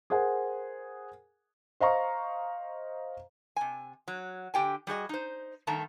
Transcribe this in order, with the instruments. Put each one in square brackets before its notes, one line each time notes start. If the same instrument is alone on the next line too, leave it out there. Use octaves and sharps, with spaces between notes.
[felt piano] G#4 A#4 C5 F#5 G#5
C5 D#5 F5 A#5 C#6
[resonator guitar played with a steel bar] C3 G#5
F#3
D3 G4 G5 G#5
G3 F#4 G#4 D#5
D#4 C5
G2 D#3 A3 A5 A#5